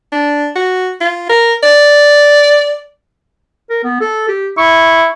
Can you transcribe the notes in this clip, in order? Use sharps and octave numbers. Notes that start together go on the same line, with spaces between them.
D4
F#4
F4
A#4
D5
A#4
B3
A4
G4
E4 C#6